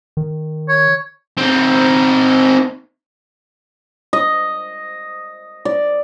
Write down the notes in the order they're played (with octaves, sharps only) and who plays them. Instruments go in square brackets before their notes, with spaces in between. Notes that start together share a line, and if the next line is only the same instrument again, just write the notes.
[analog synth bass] D#3
[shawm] C#5
[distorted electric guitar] C4 D#4
[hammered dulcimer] D#5
D5